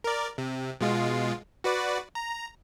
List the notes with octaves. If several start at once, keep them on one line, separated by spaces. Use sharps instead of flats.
A#4 D5
C3
B2 G#3 F4
F#4 B4 D5
A#5